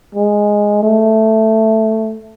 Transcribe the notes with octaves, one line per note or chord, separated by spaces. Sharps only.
G#3
A3